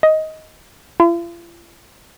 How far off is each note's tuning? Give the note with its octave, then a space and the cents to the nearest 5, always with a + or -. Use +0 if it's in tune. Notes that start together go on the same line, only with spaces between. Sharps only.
D#5 +15
F4 -45